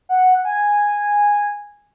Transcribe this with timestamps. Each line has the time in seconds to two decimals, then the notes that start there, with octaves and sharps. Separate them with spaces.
0.09 F#5
0.45 G#5